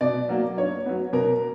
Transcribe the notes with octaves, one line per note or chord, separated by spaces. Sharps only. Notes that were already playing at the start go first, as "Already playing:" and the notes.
B2 D5
F#3 A#3
G2 C#5
F#3 B3
B2 A#4